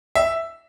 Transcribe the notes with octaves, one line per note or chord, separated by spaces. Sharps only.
E5